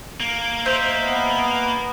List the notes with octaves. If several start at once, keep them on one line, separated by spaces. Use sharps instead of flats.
A#3
C5 D#5 E5
B3